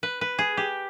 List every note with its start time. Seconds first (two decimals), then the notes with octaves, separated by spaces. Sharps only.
0.03 B4
0.21 B4
0.38 G#4
0.57 G4